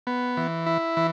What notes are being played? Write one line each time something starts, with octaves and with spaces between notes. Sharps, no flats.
B3
E3
E4
E3